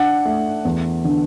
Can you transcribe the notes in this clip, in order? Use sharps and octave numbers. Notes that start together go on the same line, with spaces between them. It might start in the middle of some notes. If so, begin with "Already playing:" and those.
Already playing: D4 F#5
A3
E2
D3